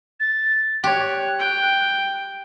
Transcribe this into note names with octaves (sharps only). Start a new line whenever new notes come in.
A6
G4 C#5 F#6
G5